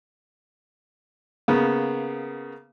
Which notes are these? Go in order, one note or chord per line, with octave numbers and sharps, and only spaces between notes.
C#3 A#3 B3